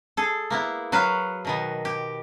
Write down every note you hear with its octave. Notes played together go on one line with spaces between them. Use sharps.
G#4 A4
A#3 B3 E4
F#3 F#4 B4 F5
B2 D#3 B3
G4